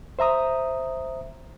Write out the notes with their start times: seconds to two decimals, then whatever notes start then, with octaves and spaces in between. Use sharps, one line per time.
0.19 C5 E5 A#5 D#6